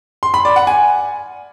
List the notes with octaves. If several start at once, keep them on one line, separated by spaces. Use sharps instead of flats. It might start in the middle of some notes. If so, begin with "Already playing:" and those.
C6
B5
D5
F#5
G#5